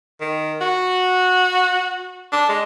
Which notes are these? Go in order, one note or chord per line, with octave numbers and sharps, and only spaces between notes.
D#3
F#4
D4
G#3